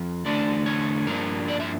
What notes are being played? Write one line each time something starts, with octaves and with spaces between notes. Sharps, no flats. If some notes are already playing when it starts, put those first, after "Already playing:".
Already playing: F2 F3
E2 D3 A3 D4 D5
C#5
G2 F3 A#3 D4 A#4
D5
E5